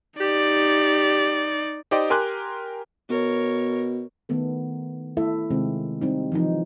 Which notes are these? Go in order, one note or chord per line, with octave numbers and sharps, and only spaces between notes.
D#4 G4 D5
D#4 G4 C5 D5 D#5 G5
G4 A#4 G#5 C6 D6 F#6
B2 A#4 C#5
D#3 A3 B3 A4
A3 E4 A4 E5
C3 D#3 G#3 C4
G3 C4 D#4
E3 F3 D#4